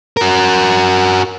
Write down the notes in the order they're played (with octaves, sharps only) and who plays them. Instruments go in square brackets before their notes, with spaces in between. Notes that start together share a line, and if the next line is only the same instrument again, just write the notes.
[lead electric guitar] F#4 A#4